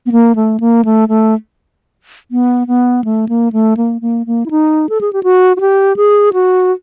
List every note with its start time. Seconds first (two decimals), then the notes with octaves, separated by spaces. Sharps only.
0.06 B3
0.12 A#3
0.35 A3
0.60 A#3
0.85 A3
1.09 A3
2.31 B3
2.67 B3
3.04 A3
3.29 A#3
3.53 A3
3.77 A#3
4.01 A#3
4.26 A#3
4.46 E4
4.51 D#4
4.89 A4
5.01 G#4
5.13 G4
5.23 F#4
5.57 F#4
5.61 G4
5.96 G#4
6.33 F#4